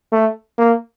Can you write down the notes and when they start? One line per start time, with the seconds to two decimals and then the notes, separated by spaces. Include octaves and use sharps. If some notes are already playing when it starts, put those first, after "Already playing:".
0.13 A3
0.58 A#3